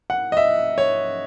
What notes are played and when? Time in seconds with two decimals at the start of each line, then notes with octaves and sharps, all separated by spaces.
0.10 F#5
0.32 D#5
0.37 E5
0.78 C#5